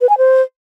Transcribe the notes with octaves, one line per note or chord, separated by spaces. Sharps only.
B4
G#5
C5